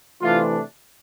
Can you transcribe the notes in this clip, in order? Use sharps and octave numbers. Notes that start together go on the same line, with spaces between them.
C3 E3 A3 D4 F4